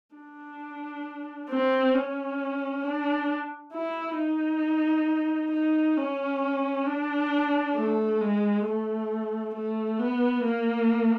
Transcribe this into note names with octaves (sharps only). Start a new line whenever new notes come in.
D4
C4
C#4
D4
E4
D#4
D#4
C#4
D4
A3
G#3
A3
A3
B3
A#3